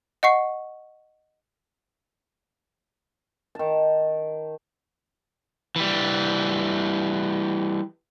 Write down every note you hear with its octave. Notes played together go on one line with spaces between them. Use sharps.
D#5 F#5 C#6 C7
D#3 A5
E3 G3